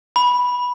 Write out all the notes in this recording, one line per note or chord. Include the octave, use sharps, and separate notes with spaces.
B5